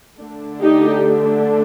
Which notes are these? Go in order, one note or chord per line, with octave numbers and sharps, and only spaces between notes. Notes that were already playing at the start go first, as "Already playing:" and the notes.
D3 A3 D4
D#4 G4